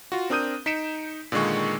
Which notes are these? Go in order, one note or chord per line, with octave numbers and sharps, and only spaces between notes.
F4 F#4
C4 D4 A#4 D#6 G6 D#7
D#4 B6 C#7 D7 E7
A#2 D3 D#3 G#3 C#6